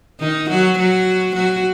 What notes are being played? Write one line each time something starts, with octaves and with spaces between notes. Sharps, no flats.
D#3 D#4
F#3 F#4
F#3 F#4
F#3 F#4